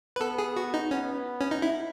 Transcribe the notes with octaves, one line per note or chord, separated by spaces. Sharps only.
B4
B3 A4
G#4
F#4
D#4
B3 C#4
C#4
D#4
E4